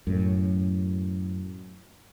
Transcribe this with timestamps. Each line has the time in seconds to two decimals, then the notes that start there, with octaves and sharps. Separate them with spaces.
0.07 F#2 A2